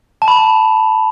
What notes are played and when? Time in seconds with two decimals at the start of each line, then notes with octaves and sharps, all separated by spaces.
0.22 A5
0.28 B5